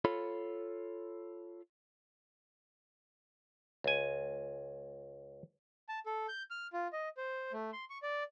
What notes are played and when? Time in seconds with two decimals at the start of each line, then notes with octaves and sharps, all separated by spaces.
0.05 F4 A4 C#5 B5
3.84 C#2 G#5
5.89 A5
6.06 A4
6.28 G6
6.50 F6
6.73 F4
6.93 D#5
7.17 C5
7.52 A3
7.73 C6
7.90 C#6
8.03 D5